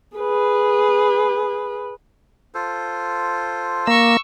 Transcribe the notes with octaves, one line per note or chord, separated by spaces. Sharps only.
G#4 B4
F4 A4 C5
A#3 C#6 E6